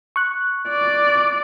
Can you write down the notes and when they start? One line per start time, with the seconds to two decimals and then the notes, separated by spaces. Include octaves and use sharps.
0.16 C#6 F#6
0.69 D5